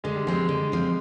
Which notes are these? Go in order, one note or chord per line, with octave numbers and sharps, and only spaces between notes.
D3 G#3
G3
F3 G#3 C4
D3
F3 C4